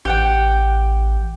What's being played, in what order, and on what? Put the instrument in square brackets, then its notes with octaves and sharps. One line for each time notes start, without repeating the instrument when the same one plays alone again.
[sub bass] A1 [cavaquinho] G4 F#5 G5